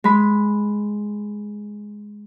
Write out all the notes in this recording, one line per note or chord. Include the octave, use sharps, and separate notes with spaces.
G#3 B5